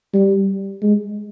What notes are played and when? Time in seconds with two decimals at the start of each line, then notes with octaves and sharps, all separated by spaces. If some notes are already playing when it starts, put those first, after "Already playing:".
0.14 G3
0.82 G#3